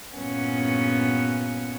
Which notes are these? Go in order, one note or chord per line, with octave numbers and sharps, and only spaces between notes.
G2 A#2 B3 C#4 F#5